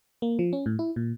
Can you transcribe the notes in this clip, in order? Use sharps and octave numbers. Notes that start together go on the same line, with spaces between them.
A#3
F3
C#4
A2
E4
A#2